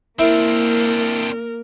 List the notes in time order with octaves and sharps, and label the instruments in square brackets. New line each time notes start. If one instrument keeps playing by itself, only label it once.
[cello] A#3 [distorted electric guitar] C4 D4 [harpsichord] E4 [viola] A#4